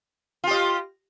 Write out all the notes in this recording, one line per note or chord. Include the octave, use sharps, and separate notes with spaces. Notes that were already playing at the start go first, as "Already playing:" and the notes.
F4 G4 D#5